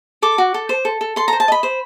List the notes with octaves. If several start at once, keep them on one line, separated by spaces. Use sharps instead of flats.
A4 D6
F#4
A4
C5
A4
A4
A4 C6
A#5
C5
A5
D#5 B5
C5